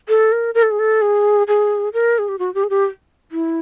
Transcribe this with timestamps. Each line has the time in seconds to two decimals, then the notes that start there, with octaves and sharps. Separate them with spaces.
0.09 A4
0.32 A#4
0.55 A#4
0.63 A4
0.71 G#4
0.79 A4
1.02 G#4
1.48 G#4
1.93 A#4
2.19 G#4
2.29 G4
2.39 F#4
2.54 G4
2.64 G#4
2.70 G4
3.32 E4